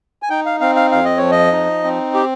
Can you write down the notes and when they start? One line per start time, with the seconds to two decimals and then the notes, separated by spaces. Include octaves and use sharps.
0.22 G#5
0.30 D#4 G5
0.46 F5
0.60 C4 F5
0.76 F5
0.91 F2 F5
1.05 D#5
1.17 F3 C#5
1.31 D#5
1.52 D#4
1.84 C4
2.14 G4